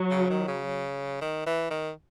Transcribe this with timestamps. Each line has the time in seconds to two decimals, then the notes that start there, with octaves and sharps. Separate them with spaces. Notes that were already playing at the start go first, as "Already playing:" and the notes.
Already playing: F#3
0.11 C#3
0.30 D#3
0.48 C#3
1.21 D#3
1.46 E3
1.71 D#3